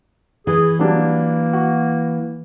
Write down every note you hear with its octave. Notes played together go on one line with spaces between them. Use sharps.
E3 G#4
F#3 G3 A#3 D4
F#4